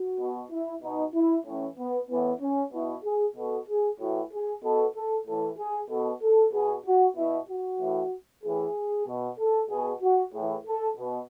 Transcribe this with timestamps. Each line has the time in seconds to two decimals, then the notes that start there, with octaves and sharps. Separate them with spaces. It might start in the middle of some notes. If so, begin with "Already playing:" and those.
Already playing: F#4
0.19 B2
0.51 E4
0.82 B2 D#4
1.14 E4
1.46 A2 E3 C#4
1.77 B3
2.09 A2 E3 B3
2.41 C#4
2.73 B2 E4
3.04 G#4
3.36 B2 A4
3.68 G#4
3.99 A2 E3 F#4
4.32 G#4
4.63 B2 A4
4.95 A4
5.27 A2 E3 A4
5.58 G#4
5.89 B2 A4
6.22 A4
6.53 B2 G#4
6.85 F#4
7.16 B2 E4
7.49 F#4
7.81 A2 E3
8.44 A2 E3 G#4
9.07 B2
9.39 A4
9.70 B2 G#4
10.02 F#4
10.33 A2 E3 G#4
10.66 A4
10.97 B2